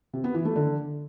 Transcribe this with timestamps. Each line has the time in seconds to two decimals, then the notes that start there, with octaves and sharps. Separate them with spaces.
0.13 C3
0.24 B3
0.35 E3
0.45 A3
0.56 D3